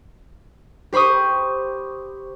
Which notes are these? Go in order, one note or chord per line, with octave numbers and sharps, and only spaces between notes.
G4 C5 B5 C#6 D#6